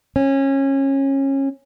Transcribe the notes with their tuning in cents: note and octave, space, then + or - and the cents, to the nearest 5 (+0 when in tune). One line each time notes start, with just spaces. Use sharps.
C#4 -25